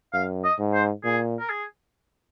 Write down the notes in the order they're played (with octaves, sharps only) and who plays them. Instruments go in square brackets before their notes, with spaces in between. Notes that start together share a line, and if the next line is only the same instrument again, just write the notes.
[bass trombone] F#2 [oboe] F5
[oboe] D#5
[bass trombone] G#2
[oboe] C5
[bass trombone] A#2 [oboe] G#4
[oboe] A#4
G#4